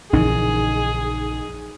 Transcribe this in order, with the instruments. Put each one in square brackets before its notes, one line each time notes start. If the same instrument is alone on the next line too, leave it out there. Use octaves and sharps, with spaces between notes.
[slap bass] A#1 C#3 E3 [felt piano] D#4 [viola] G#4